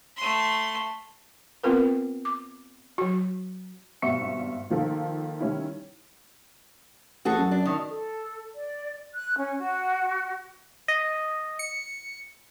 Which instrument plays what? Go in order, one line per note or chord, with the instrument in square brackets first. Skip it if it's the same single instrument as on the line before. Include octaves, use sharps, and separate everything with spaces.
[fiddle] A3 C6
[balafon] B3 C4 F4 A#4 B4
D6
F#3 F#4
[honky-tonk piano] G#1 G2 B2 E5 C#6 C#7
D#3 F3 A#3 A4
D#3 G3 C#4 E4
[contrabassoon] A1 [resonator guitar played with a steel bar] F#4 G#4 A4
[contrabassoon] F#2
[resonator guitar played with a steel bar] D4
A2 D#3
[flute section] A4
D5
F#6
C#4
F#4
[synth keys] D#5
C#7